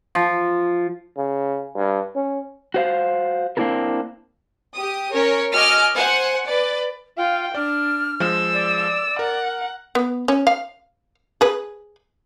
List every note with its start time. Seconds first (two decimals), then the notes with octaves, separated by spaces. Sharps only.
0.15 F3
1.17 C#3
1.76 G2
2.16 C#4
2.74 F#4 C5 F5
3.57 A#3 C4 D4 E4 A4 A#4
4.73 G4 D#6
5.11 C#4 A#4 C#5
5.54 F#4 D#5 G#5 D6 F6
5.95 C5 F#5 G#5
6.45 B4 D5
7.17 F4 F5 G5
7.55 D4 D5 F6
8.20 F3 G#3 E6
8.53 D5
9.19 A#4 F#5
9.95 B3
10.28 C#4
10.47 F5
11.41 G#4 B4